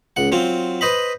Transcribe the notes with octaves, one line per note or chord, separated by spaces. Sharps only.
C#2 F#5
F#3 C4 F4
B4 C5 D#5 B5